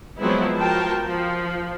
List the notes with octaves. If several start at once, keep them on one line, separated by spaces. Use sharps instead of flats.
F3 F#3 G#3 B3 C4 E4
F3 F#4 A#4 G5 A5
F3